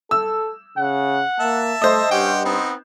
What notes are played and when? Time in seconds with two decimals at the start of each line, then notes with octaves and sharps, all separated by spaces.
0.11 A4 E6
0.78 C#3 F#5
1.40 A#3 E5 A5
1.82 A3 C5 D#5
2.11 G2 C#4 G4 F#5 G5
2.45 B3 C4 D#4